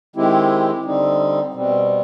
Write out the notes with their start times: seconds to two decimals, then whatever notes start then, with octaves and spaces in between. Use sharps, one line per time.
0.16 D#3 G#3 C4 E4 G4
0.85 D3 G3 C4 D#4
1.54 B2 G3 C4